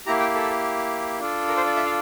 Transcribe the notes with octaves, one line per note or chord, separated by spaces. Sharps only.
A#3 E4 G4 A#5
G5
A4
D4 F4 A4
A#4
C5
D5
E5
F5